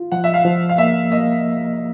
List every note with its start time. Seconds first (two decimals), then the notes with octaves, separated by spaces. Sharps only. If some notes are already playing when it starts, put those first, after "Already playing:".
Already playing: F4
0.12 F3 F#5
0.24 E5
0.34 F5
0.45 F3
0.69 F5
0.78 A#3 E5
1.11 A#3 D#5